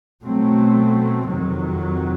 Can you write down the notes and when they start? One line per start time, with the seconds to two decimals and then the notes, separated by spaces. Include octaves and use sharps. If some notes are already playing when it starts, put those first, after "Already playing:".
0.22 B2 F#3 A3 C4
1.29 F2 C3 D#3 F#3